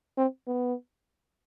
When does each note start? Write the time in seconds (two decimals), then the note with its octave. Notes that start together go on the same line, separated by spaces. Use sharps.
0.18 C4
0.47 B3